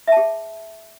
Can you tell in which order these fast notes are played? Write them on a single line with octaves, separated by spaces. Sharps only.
E5 A5 G#4